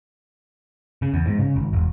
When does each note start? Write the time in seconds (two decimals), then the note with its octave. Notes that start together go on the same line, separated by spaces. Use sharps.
1.02 C#3
1.14 E2
1.27 G#2
1.39 C#3
1.56 G#1
1.73 E1